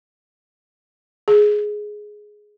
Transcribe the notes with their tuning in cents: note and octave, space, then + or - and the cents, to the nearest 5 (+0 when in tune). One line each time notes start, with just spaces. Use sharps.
G#4 +5